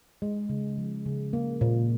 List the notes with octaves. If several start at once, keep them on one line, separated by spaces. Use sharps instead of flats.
G#3
C#3
F3
C#3
A#3
A#2